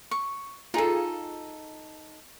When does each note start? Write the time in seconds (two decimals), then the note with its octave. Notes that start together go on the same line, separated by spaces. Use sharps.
0.11 C#6
0.74 D#4 F4 G#4 A4